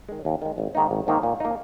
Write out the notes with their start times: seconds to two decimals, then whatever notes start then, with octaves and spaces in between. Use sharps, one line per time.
0.09 D#3 G#3
0.25 D#2
0.42 D#3 G#3
0.58 G#1
0.75 G#2 D#3 A#3 D#4
0.91 G#1
1.07 G#2 D#3 A#3 D#4
1.23 A#2
1.40 A#3 D#4